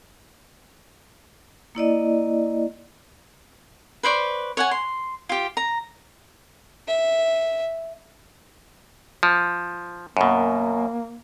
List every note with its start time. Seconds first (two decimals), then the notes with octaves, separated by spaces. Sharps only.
1.75 A#3 E4 D5 D#5
4.03 B4 C5 D5 C#6
4.57 C#5 F#5 G#5
4.71 C6
5.29 F4 G4
5.57 A#5
6.88 E5
9.23 F3
10.17 F#2 B2 A#3